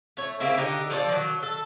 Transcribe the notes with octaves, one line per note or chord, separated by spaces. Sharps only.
A3 C#5
C#3 A#3 C4 E4
D3 D#4 G4
F3 A4 C#5 D5
D#3 F#3
A4